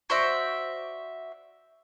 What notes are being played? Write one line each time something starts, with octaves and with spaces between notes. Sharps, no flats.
F#4 C5 D5 E5